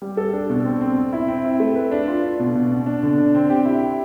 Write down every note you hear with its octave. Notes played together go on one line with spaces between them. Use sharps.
G3
A4
D4
B2
C4
C4
C4
E4
C4
E4
A3
B4
D4
F4
D4
B2
B2
B2
D4
D3
D4
C4
G4
E4
G4